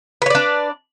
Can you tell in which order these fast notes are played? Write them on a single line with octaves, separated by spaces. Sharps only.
B4 C#5 D5 D4